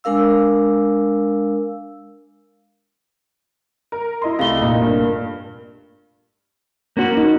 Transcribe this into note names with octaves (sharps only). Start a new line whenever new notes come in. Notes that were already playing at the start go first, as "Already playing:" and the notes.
G#3 D4 A#4 F5 E6
A#4
E4 D#5 C6
C2 A3 F5 G7
F1 A#2 D#4
G2
A#3 C#4 F#4
D#4